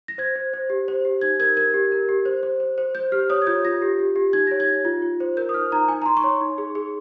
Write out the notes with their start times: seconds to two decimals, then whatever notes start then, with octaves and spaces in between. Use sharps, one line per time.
0.08 A#6
0.18 C5 G#6
0.36 C5
0.53 C5
0.70 G4
0.88 C5
1.05 G4
1.22 D#4 G#6
1.40 A#4 G#6
1.57 A#4 G#6
1.74 G4
1.92 A#4
2.09 G4
2.26 C5
2.43 C5
2.60 C5
2.78 C5
2.95 C5 G6
3.12 G4 F6
3.30 C#5 D#6
3.42 G#6
3.47 F4 G6
3.65 F4 A#6
3.82 G4
3.99 G4
4.16 G4
4.33 D#4 G#6
4.47 C#5 A#6
4.60 G#6
4.68 D#4
4.85 F4
5.02 F4
5.20 C5
5.37 A#4 G6
5.49 D#6
5.54 D#4 F6
5.72 D#4 A#5
5.88 D#4 G#5
6.02 A#5
6.06 D#4 C6
6.17 C#6
6.23 C#5 C6
6.41 D#4
6.58 G#4
6.75 G#4